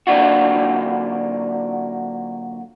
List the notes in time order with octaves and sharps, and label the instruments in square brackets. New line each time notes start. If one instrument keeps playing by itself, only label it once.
[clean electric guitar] D3 F#3 A#3 D4 F4 F#4